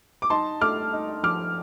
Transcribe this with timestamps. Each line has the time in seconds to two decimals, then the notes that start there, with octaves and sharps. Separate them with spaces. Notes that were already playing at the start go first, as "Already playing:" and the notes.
0.22 D6
0.30 D#4 A5 C6
0.61 A3 D6 F6
0.93 D#4
1.23 F3 D6 F6